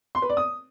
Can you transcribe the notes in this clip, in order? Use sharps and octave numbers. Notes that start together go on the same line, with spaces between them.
C6
B4
D5
D#6